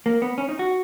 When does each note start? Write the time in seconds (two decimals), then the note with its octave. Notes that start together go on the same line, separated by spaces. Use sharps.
0.06 A#3
0.22 B3
0.38 C#4
0.49 D#4
0.59 F#4